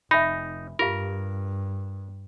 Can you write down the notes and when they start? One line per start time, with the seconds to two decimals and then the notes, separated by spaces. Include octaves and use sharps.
0.11 F1 D#4 E5 G#5 B5
0.79 G2 F4 G4 A#4 F5